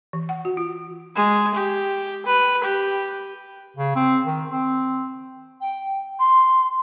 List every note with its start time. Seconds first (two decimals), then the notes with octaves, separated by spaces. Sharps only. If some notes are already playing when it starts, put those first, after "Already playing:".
0.13 E3
0.29 F#5
0.45 F#4
0.57 F4
1.15 G#3
1.54 G4
2.26 B4
2.64 G4
3.77 C#3
3.95 C4
4.26 D#3
4.51 C4
5.61 G5
6.20 C6